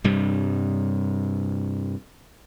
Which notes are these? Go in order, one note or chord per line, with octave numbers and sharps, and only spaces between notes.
G2 C3 G3